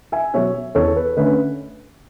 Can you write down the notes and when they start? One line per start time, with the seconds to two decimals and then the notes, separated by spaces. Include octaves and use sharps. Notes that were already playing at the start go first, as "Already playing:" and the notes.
0.12 E5 G#5
0.33 B2 F#3 C#5 E5
0.75 E2 A4 C#5
0.96 B4
1.17 D3 A3 C#4 B4